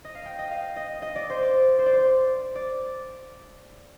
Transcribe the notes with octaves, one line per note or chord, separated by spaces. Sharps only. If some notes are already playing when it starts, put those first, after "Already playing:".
D#5
F5
G5
D#5
F5
D#5
D#5
D5
C5
D5
C5
D5
C5
D5